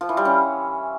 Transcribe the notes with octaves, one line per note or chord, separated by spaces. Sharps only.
F3
E3
G3
C#4